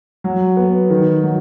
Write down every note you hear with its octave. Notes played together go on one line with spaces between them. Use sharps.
F#3
B3
D#3
F#3